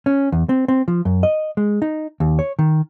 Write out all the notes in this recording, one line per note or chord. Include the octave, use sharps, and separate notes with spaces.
C#4
E2
C4
C4
F3
F#2
D#5
G#3
D#4
D#2
C#5
D#3